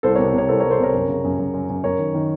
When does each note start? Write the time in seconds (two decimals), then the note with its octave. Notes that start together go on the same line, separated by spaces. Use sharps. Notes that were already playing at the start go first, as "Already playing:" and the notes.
0.03 C2 A4 C5
0.15 A#4 C#5
0.18 C3
0.34 C3 A#4 C#5
0.49 C2 A4 C5
0.60 A#4 C#5
0.64 C2
0.71 A4 C5
0.79 C3 A#4 C#5
0.94 F#2
1.08 C#3
1.24 F#2
1.39 F#2
1.54 F#2
1.69 F#2
1.84 F#2 A#4 C#5
1.99 D#3
2.14 D#3